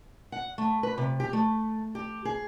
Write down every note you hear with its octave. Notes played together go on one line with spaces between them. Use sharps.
F#5
A3
B4
C3
G4
A3
G4
G#4